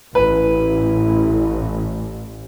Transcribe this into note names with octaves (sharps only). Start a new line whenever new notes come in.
A1 E4 B4